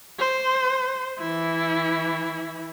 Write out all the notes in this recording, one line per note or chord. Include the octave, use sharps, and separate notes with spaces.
C5
E3 E4